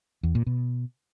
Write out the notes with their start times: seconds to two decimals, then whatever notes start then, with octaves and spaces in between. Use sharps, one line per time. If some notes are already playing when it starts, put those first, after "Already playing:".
0.23 E2
0.35 A#2
0.47 B2